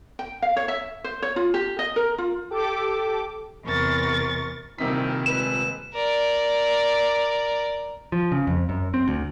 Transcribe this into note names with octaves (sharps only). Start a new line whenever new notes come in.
G5
F5
C#5
E5
C5
C#5
F4
G4
D#5
A#4
F4
G4 A4 D6
E2 C3 A#4 C#6 A6
D#1 C2 C3 D#3 B6
A#2 G#3 B4 E7
A#4 D5
F3
C#3
F2
F#2
C4
D2